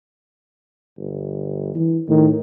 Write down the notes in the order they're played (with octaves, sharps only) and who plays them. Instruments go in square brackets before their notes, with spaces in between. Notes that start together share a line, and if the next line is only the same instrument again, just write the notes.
[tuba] G1
E3
[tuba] A2 [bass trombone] D#3